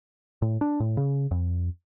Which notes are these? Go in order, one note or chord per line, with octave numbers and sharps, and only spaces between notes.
A2
D4
A2
C#3
F2